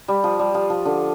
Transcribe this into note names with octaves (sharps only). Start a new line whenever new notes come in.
G3
F3
G3
F3
F3
D3